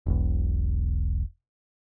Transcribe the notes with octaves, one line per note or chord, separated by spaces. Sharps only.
E1 B1